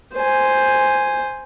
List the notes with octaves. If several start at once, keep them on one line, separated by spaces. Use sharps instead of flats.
C5 G#5